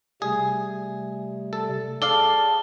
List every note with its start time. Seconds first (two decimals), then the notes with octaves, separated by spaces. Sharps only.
0.22 C3 G3 A3 G#4
1.53 A4
2.02 G#4 A4 D5 F5 A5 G7